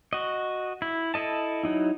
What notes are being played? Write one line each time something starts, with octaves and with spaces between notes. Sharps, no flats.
F#4 D#5
E4
E4 A4 D#5 A5
F#3 D#4 E4